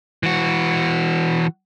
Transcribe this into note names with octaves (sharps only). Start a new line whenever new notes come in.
E3 F#4